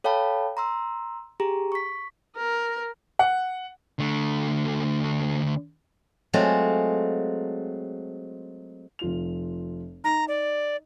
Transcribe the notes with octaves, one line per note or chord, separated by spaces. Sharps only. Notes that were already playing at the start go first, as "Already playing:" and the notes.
A4 C#5 F5 G5 A5 B5
A#5 C6 E6
G4 G#4 A#5
C#6 B6
A#4
F#5
D3 A3
F#3 G#3 A3 C4 F4
F1 F4 F7
D#4 A#5
D5